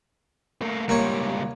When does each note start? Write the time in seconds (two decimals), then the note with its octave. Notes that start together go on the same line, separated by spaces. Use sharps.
0.61 A3 A#3
0.89 C#2 G3 A#3 C#5